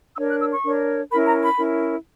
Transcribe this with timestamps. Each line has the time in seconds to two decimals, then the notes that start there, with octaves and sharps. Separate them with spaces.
0.16 D4 A#4 C#5 E6
0.29 F#6
0.40 E6
0.52 C#6
0.64 D4 A#4 C#5
1.11 C#4 E4 A#4 B5
1.27 A#5
1.42 B5
1.58 C#4 E4 A#4